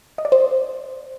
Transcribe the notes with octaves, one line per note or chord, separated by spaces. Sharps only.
D#5
D5
C5